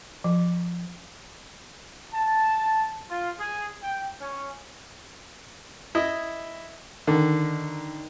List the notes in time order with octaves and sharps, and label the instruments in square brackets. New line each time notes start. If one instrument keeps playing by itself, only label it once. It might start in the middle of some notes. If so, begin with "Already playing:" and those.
[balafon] F3
[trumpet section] A5
F4
G#4
G5
C#4
[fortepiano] E4 D#5
[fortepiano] D3 [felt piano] D#3